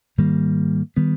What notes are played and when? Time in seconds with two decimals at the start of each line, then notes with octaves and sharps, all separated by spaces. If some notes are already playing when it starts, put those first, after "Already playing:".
0.18 G#2 D#3 G3 A#3
0.97 D#3 G3 B3